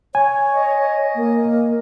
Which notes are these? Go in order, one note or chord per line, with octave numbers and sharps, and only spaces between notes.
C#5 G#5
D#5
A#3